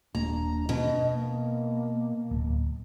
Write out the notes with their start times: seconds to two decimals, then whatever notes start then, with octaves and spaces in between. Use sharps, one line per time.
0.15 D#1 A#3 D4 A#5
0.69 B2 D4 D#5
1.14 A#3
2.31 D1